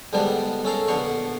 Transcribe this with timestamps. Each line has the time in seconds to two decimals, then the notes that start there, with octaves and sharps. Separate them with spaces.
0.13 G#2 D3 G3 B3 D4
0.65 C#4 A4 A#4 F5
0.88 A#1 D3 B3 F5 C#6